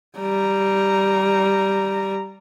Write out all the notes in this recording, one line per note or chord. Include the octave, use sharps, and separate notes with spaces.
G3 A#5